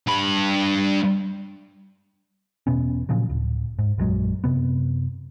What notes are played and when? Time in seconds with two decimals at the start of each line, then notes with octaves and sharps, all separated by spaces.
0.07 G2 B5
2.67 E1 B2 B3 C#4
3.09 A#2 C#3 F3 F#3
3.30 D1
3.79 G#2
3.98 A#1 F#2 F#3 G#3
4.44 F#2 C3 B3